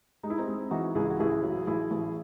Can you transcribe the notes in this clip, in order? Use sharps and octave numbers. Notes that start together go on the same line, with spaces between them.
G#3 D#4
E4
C4 D#4
G#3
E3 D#4 F#4
C#2 E4 G#4
F#4
A1 E4 G#4
F#3
A1 E4 G#4
A1